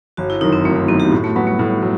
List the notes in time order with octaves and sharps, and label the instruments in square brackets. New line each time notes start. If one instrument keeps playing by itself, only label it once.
[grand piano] G1 [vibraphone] F#4
[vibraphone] E4
[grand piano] F#2 D#3 [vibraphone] D#4
[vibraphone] C4
[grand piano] G1 [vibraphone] A3
[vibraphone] A3
[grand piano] F#2 D#3 [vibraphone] B3
[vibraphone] G4
[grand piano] A2 [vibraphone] F#4
[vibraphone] A3
[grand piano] F#3 B3 F#4 [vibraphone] G3
[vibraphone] A3
[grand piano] A2
F#3